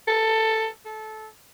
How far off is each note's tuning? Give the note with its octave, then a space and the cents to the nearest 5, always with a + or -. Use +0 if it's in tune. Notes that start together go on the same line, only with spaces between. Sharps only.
A4 +10
A4 -20